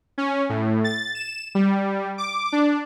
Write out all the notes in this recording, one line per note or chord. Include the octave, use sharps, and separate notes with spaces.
C#4
A2
A6
E7
G3
D6
D4